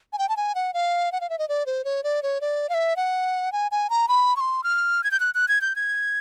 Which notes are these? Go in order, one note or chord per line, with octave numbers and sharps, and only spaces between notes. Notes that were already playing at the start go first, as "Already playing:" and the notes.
G#5
G5
A5
G#5
F#5
F5
F#5
F5
E5
D#5
D5
C5
C#5
D5
C#5
D5
F5
E5
F#5
G#5
G#5
A#5
B5
C#6
C6
F6
G#6
G6
F#6
F#6
G#6
G6
G#6